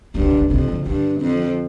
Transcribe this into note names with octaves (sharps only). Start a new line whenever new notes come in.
G2 D#3
D3
C3
D3
F2 C3
D3
G2 D3
F2